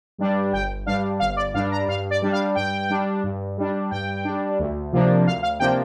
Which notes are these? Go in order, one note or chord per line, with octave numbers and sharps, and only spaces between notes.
G2 G3 D4
G1 G5
G2 G3 D4 F5
G1 F5
D5
G2 G3 D4 F5
A#5
G2 F5
D5
G3 D4
F5
G2 G5
G3 D4
G2
G3 D4
G2 G5
G3 D4
D2
C3 F3 A#3 D4
D2 F5
F5
C3 F3 A#3 D4 G5